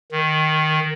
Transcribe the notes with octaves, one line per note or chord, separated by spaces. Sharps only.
D#3